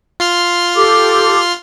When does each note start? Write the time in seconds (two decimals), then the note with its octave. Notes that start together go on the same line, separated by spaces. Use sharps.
0.20 F4 C6 F6
0.76 G4 A4 D6